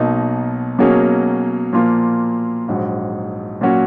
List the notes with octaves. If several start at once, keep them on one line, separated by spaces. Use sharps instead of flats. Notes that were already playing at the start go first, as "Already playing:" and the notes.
Already playing: B1 B2 A#3 D#4
B2 F#3 A#3 C#4 G#4
A#2 F3 A#3 F4
A#1 G#2 F#3
A#2 F#3 C#4 F#4